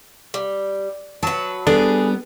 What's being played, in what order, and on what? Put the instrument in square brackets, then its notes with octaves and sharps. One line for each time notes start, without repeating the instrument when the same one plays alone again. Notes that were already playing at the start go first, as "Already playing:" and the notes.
[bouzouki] G3
[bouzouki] F#3 B4 [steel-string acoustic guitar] A5
[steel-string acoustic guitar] G3 B3 [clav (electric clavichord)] D4 [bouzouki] G#4 [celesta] A4